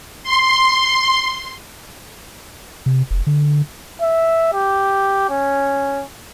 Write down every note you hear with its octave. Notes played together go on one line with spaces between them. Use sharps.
C6
C3
F1
D3
E5
G4
C#4